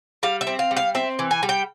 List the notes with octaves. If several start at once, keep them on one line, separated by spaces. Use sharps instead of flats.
G3 F5
E5
C4
F5
G3
F5
C4 E5
E3
G#5
G3
G5